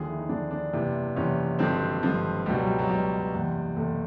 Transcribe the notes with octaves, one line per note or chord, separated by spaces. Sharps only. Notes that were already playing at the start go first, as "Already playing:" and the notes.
Already playing: D#2 D3 F3 G#4
E4
D#4
D#2 D3 F3 D4
D4
F#1 E2 C3 E3
F#1 E2 C3 E3 C#4
G#1 G2 D3 F3 C4
G#1 G2 D3 F3
C#2 B2 G3
F#3
G3
F#3
C#2 B2 G3
F#1 E2 C3
F#1 E2 C3 A3